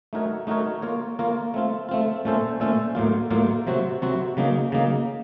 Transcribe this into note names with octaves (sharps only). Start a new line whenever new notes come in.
A3 D#4 F#4 A#4 C#5
A3 D#4 F#4 A#4 C#5
A#3 F4 A#4 C#5
A#3 F4 A#4 C#5
A3 C4 F4
A3 C4 F4
A#2 A3 C#4 A4 C5
A#2 A3 C#4 A4 C5
A2 F#3 A#3 F4
A2 F#3 A#3 F4
C3 F#3 C4 F#4
C3 F#3 C4 F#4
C#3 F#3 A#3 D#4
C#3 F#3 A#3 D#4